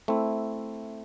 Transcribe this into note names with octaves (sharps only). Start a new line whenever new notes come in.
A3 C4 E4